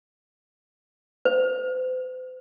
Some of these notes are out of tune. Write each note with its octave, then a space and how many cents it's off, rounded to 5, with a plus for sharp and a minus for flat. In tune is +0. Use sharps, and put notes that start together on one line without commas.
C5 -45